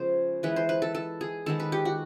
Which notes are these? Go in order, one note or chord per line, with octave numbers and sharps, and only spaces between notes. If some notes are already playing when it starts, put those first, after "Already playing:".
Already playing: C#3 F3 G#3 B3 C5
E3 G#3 B3 B4
C5
B4
A4
A4
G#4
D#3 G#3 B3 A4
B4
G4
F#4